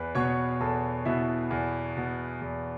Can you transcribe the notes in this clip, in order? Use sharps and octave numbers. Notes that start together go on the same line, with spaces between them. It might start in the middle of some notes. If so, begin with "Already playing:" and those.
Already playing: E2 B4
B2 B3 C#5 C#6
E2 A4 A5
B2 B3 E4 E5
E2
B2 B3
E2